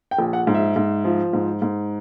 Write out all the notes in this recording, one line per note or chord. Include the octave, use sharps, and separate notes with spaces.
G5
A#1
F#5
G#2
E5
G#2
F3
G#2
G#2